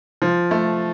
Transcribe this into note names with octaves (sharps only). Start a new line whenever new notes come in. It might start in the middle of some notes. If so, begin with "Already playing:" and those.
F3
A3